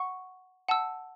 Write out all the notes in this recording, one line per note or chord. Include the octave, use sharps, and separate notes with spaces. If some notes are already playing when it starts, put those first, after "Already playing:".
Already playing: F#5 C#6
F#5 A5 E6